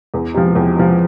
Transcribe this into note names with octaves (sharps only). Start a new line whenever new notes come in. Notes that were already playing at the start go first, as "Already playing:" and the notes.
E2
C3 F3
E2
C3 F3